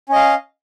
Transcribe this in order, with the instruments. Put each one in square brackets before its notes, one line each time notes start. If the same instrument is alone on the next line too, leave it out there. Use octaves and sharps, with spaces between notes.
[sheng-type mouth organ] C#4
D#5
F5